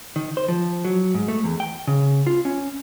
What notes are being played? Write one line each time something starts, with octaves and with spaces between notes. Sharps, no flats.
D#3
C5
F3
F#3
G#2
A3
E2
G5
C#3
F4
C#4